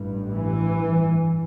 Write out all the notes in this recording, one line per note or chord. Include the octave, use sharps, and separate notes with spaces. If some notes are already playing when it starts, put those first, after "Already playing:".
Already playing: A1 G2
E3